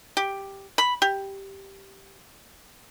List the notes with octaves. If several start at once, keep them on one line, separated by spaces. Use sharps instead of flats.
G4
B5
G4